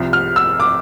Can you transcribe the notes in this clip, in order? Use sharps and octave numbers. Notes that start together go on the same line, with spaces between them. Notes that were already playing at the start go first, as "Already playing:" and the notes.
Already playing: C2 C3 F3
F6
E6
D6